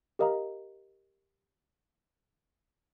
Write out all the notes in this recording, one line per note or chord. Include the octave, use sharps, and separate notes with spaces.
G4 A#4 D#5 F5 A#5